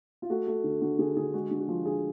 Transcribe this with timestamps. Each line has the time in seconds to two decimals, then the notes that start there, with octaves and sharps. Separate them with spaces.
0.22 F4
0.30 A3 F#4
0.47 A3
0.64 D3
0.81 D3 F#4
0.99 D3 G#4
1.17 D3 G#4
1.33 G#3 F#4
1.51 D3
1.59 F#4
1.68 F3
1.85 D3 G#4